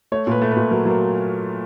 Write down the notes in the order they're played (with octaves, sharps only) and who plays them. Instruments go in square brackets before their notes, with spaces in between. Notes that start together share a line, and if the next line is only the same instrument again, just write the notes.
[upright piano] A3 C#5
A#2 B4
A3
B4
A#2
F#3 A#4
F#3
A#4